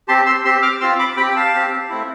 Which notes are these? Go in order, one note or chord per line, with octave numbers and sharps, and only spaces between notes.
C4 G4 A5 C6
C6 E6
C4 G4 C6 E6
D6 F6
C4 F4 C6 E6
B5 D6
C4 G4 G5 B5
G5
F5 A5
C4 G4
A3 C4 E4